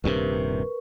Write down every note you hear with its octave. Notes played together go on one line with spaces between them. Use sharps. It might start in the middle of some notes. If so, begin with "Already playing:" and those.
D#1 G2 C3 A#4 B4 C#6